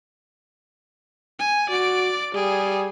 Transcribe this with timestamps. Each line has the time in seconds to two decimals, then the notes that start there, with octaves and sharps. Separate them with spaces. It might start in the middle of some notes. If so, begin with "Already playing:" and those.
1.39 G#5
1.70 F#4 D5 D7
2.34 G3 G#4